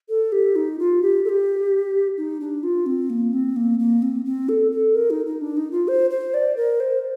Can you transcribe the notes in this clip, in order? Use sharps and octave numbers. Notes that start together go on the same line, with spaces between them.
A4
G4
D#4
F4
G4
A4
G4
D#4
D4
F4
C4
A#3
C4
A#3
A#3
C4
C4
A4
A4
A#4
D#4
D#4
D4
D#4
F4
C5
C5
D5
A#4
C5